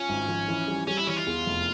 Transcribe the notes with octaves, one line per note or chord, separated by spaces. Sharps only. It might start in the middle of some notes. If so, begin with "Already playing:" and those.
Already playing: C#4 F4
G#1
F3
E3
G3
G3 C#4
E4
E3 C#4
F4
E2
F1